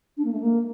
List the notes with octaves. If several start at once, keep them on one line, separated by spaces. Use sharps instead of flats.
D4
A#3
A3
A#3